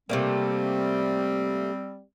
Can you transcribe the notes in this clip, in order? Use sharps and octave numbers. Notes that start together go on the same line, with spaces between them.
C3 G3 A3 A#3 C4